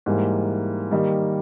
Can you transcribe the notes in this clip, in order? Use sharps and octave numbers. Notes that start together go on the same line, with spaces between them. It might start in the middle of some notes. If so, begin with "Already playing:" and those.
G#2 E3 G3 A#3
D#3 G3 A#3 D#4